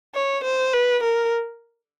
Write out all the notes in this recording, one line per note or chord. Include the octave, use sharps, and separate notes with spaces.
C#5
C5
B4
A#4